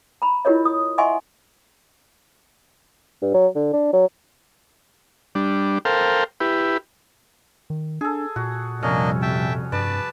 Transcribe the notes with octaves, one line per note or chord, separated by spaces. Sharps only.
A#5 B5
E4 F4 G4 A#4 C#5 D#5
D#6
D#5 E5 F#5 G#5 C6 C#6
G2
F#3
D3
D4
F#3
G3 D4
A4 A#4 C5 F5 G5
E4 G4 B4
D#3
D4 G#4 A4
A#2 F#4
F2 C3 G3 A#3 C#4 D4 D#5
E5 G5 A5
G2 B4 D5 A5